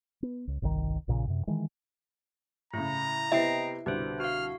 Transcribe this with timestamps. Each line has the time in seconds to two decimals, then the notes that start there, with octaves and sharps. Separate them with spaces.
0.23 B3
0.47 C#2
0.62 G1 C2 C3 D#3
1.08 A#1 A#2 C#3
1.27 F#2 C3
1.47 D#3 E3 G#3
2.73 A2 C#3 E4 A#5
3.32 C3 B3 E4 D#5 E5 G5 C7
3.86 C2 B2 D3 G4 B4 C5
4.20 F#4 F5 F6